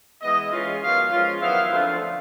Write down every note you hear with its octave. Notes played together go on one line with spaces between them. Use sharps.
E3 G#3 B3 E4 D#5
E3 G#3 C#4 F4
D#3 F#3 B3 F5
F3 G#3 C#4 F4
D#3 F#3 B3 E4 F5
D3 F3 A3 C4 F4